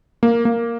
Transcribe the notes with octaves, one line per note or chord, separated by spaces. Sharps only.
A#3
A#3